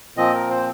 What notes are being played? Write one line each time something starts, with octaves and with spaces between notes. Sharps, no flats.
A#2 F3 C4 D#5
A#4
C5